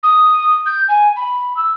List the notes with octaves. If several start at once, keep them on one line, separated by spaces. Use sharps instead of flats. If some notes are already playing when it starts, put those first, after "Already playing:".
D#6
G6
G#5
B5
E6